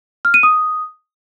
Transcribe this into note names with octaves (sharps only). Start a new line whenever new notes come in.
F6
D#7
D#6